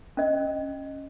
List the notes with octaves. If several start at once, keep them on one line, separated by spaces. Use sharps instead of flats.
C#4 D#5